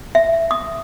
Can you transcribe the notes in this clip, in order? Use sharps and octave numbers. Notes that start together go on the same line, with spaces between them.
E5
D#6